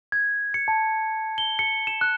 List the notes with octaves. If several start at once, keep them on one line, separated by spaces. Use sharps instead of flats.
G#6
C#7
A5
G7
C#7
E7
F#6